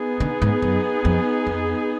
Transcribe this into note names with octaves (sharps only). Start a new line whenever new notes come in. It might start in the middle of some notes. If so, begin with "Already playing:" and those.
Already playing: B3 D#4 G#4
D3
G#2
F#2
F2
F2